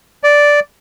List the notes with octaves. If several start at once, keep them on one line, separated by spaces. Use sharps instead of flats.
D5